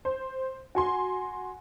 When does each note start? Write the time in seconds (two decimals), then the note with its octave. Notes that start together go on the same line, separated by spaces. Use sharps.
0.05 C5
0.75 F#4 G#5 C6